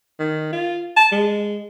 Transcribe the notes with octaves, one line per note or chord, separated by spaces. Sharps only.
D#3
F4
A5
G#3